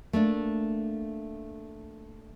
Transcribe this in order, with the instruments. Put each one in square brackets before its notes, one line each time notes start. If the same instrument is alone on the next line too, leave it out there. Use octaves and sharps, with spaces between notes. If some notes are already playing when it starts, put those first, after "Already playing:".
[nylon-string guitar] A3 A#3 D4